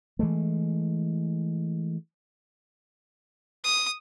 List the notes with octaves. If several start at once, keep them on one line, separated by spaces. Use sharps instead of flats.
E3 G#3 A3
D#6